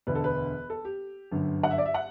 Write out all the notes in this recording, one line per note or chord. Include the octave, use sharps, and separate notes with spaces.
E1 D2 D3 B4
A4
B4
A4
G4
G1 F#2 D3
F#5
E5
D5
E5
F#5